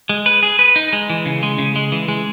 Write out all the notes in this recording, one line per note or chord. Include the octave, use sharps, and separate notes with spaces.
G#3
B4
G#4
B4
D#4
G#3
E3
C#3
G#3
C#3
G#3
E3
G#3